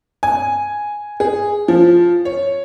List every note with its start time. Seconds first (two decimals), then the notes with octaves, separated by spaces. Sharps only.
0.23 G#5
1.20 G#4
1.68 F3
2.25 C#5